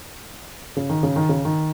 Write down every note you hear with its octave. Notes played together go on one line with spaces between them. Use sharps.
C#3
D#3
C#3
D#3
C#3
D#3